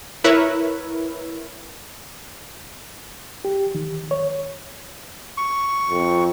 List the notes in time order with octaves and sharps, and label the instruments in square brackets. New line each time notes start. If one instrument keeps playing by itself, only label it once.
[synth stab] E4 A#4 B4 C#5 E5
[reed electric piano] G4
D#3
C#5
[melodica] C#6
[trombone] F2